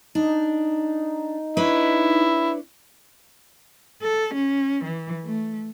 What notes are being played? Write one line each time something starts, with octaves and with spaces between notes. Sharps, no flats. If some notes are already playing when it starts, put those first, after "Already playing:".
D4 D#4
D4 E4 B4 C#5
A4
C#4
E3
A3